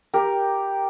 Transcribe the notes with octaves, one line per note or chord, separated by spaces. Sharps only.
G4 A#4